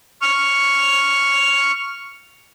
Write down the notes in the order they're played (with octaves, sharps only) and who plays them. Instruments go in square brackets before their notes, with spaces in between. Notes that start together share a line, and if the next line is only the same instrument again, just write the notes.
[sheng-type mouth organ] C#6 F6